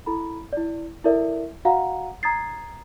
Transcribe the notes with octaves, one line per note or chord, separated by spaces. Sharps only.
E4 A4 A#5 B5
E4 D5
E4 A4 A#4 D5 E5
F#4 D#5 F5 F#5 A#5
A#5 D#6 G#6 A6 C7